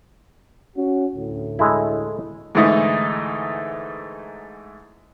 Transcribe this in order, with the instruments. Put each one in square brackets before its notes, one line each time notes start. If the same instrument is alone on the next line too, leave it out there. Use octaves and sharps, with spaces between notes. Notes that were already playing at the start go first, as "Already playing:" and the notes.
[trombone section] C#4 F#4
D2 A2
[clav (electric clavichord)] G#3 A3 E4
[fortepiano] G#2 D3 E3 A3 D#4 E4